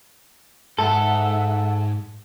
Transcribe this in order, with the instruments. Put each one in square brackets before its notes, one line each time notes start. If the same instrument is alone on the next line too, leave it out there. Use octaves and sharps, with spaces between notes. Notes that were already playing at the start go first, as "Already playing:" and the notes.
[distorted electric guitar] G#2 [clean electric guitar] A4 [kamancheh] E5 F#5